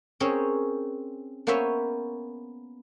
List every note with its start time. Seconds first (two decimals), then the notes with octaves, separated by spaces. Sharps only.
0.20 C4 C#4 G#4 A#4 C5 C#5
1.47 A#3 B3 C#4 C5 C#5 E5